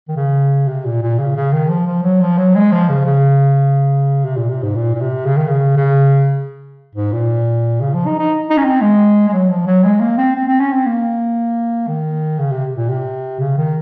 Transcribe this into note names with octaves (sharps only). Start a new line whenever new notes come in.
D#3
C#3
C3
A#2
A#2
C#3
C#3
D#3
F3
F3
F#3
F3
F#3
G#3
F3
C#3
C#3
C3
A#2
C3
G#2
A#2
A#2
C3
C#3
D#3
C#3
C#3
G#2
A#2
C#3
F3
D#4
D#4
D#4
C#4
C4
G#3
G#3
F#3
F3
F#3
G#3
A#3
C4
C4
C4
C#4
C4
A#3
D#3
C#3
C3
A#2
C3
C#3
D#3